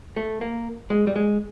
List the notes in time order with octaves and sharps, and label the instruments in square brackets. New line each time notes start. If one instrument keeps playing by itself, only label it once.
[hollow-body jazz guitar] A3
A#3
G#3
G3
G#3